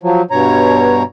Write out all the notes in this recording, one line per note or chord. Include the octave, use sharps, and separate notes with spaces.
F3 F#3
G2 B2 C#5 A#5